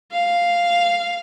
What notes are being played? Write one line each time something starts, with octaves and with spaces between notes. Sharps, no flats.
F5